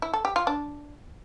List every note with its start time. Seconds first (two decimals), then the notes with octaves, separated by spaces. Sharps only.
0.02 E4
0.13 A4
0.25 G4
0.36 F4
0.47 D4